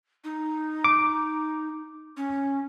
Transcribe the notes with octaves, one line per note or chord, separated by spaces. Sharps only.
D#4
D6
C#4